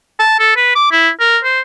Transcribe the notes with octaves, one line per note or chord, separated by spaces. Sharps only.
A5
A4
B4
D6
E4
A#4
C5